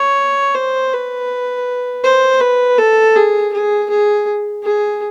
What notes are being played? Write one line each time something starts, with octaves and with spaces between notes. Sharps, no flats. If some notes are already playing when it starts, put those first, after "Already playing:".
Already playing: C#5
C5
B4
C5
B4
A4
G#4
G#4
G#4
G#4